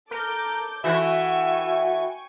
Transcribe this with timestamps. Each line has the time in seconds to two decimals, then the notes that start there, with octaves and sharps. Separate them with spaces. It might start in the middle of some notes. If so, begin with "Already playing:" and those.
0.11 A4 A#4 D6 G6
0.84 E3 A3 E4 F#4 E5 G5 G#5 C#6